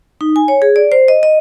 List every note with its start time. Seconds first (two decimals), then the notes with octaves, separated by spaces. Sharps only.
0.21 D#4
0.36 G#5
0.48 C#5
0.62 G#4
0.76 D5
0.92 C5
1.08 D#5
1.23 D#5